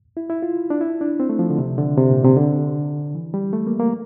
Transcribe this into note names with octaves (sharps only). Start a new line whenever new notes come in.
E4
E4
F4
D4
E4
D4
C4
A3
F3
D3
C3
D3
C3
A#2
C3
D3
E3
G3
A3
A#3
A#3